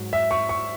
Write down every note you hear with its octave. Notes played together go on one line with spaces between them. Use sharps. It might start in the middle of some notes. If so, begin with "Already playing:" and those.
Already playing: G#2 F#3
E5
C#6
C#6